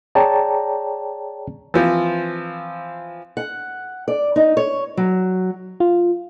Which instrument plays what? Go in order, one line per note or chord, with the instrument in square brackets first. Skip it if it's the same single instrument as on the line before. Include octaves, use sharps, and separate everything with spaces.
[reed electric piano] G#4 C#5 D5 G5 A5 A#5
[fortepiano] E3 F3 C4
[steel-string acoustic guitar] F#5
D5
D#4
C#5
F#3
[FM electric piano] F4